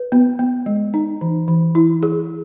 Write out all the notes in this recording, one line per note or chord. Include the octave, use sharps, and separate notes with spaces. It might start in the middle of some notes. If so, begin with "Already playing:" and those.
Already playing: B4
B3
B3
G#3
D#4
E3
E3
E4
G#4